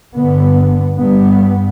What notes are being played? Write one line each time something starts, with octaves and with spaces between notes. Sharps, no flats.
G2 D3 B3
G2 G3 B3